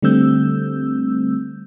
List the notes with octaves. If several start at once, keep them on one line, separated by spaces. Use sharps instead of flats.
D3 G3 A3 C4 E6 G6